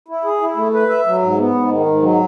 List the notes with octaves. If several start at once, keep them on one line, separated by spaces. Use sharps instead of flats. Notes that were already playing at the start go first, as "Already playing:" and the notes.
E4
G#4
E4
A3
B4
E5
F#3
G#2
B3
G#2
D#3
G#2
F#3